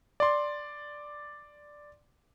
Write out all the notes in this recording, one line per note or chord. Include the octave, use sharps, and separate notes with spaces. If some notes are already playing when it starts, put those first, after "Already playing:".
D5 C6